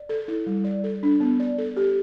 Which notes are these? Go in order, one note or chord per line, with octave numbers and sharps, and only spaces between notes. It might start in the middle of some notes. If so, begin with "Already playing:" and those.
Already playing: D5
A4
E4
G3
D5
A4
D4
B3
D5
A4
G4